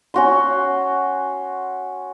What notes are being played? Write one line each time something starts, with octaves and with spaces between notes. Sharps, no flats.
C#4 F#4 C6